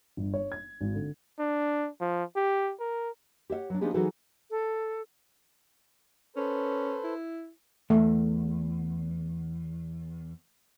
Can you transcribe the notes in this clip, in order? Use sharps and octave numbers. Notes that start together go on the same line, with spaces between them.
G1
C#5
G#6
G#1
D3
D4
F3
G4
A#4
G4 C#5 E5 F#5
F#3 D4
F3 B3 D4 D#4 G4 G#4
E3 F#3 D#4 F#4 G#4 A4
A4
C#4 A4 B4 C5
E4
E2 A3